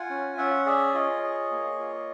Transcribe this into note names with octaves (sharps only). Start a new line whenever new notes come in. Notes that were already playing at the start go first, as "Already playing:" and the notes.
Already playing: F4 F#5 G#5
C#4
C#4 E5 F#5
G#4 D5 E5
F4 C#5 D#5
G#4
A#3
F4